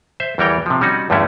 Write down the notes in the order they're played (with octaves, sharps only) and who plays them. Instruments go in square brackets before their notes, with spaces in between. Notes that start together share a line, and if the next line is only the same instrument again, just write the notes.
[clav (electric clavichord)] C5 E5
E2 E3 G3 A#4 C#5 G5
C3 F3
G3 C#4 D#4 F#4
E2 G2 D3 A3 C#4 E4